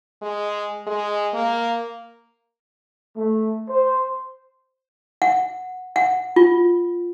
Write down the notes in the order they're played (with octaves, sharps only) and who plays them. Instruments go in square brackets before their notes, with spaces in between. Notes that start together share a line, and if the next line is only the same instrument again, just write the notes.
[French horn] G#3
G#3
A#3
[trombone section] A3
C5
[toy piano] F#5
F#5
F4